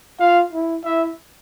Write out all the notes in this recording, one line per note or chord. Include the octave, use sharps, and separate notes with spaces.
F4 F5
E4
E4 E5